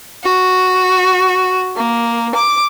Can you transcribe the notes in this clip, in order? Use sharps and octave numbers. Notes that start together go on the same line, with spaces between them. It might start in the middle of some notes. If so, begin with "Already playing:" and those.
F#4
A#3
D6